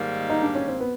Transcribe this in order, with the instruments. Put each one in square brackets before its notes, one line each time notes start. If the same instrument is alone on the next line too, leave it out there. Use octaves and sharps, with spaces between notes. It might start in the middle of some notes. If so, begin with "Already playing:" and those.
Already playing: [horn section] G#2 D#3 G3 A#3
[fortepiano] D#4
D4
C#4
C4
B3